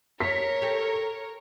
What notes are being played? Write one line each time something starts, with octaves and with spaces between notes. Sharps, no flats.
A#4 C#5 B6
G4 A4